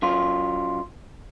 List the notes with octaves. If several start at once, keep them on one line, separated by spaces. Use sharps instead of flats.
F#2 F4